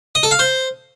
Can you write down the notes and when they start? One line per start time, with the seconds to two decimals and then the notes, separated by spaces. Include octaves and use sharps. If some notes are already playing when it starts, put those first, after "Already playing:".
0.15 D#5
0.23 A4
0.31 F5
0.39 C5